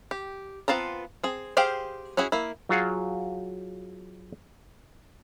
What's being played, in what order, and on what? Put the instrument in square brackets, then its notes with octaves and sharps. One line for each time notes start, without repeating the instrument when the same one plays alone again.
[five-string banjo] G4
B3 C4 F4 A5 A#5
C4 G#4
G4 G#4 C5 F5 G5
C#4 E4 F#4 G#4
A#3 E4
[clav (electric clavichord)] F#3 F4 F#4 G#4 F5 F#5